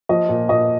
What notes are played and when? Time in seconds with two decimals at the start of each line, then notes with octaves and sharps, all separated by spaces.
0.09 F3 D#5
0.29 A#2
0.49 A#2 D#5